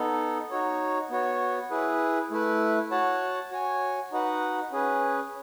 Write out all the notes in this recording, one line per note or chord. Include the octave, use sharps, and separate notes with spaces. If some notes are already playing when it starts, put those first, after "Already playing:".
Already playing: B3 D#4 A4
D#4 F#4 C#5
B3 F#4 C#5
E4 G#4 B4
A3 E4 B4
F#4 C#5 F#5 A5
F#4 C#5 G#5
D#4 F#4 B4 F#5
C#4 G#4 B4